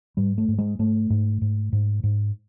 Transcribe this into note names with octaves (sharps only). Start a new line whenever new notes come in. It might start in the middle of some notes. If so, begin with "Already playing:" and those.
G#2 G3
A3
G#2
G#3
G#2 A3
G#2
G#2
G#2
G#2